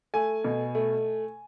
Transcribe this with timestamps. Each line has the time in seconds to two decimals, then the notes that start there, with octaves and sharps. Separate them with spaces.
0.14 A3 G#5
0.44 B2
0.75 A3